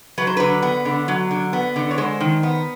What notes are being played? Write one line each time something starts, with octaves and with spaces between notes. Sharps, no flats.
F#3 B4
C5
D3 B4
B3
D3
F#3
D3
B3
D3
C#5
G#3 C5
D#3
B3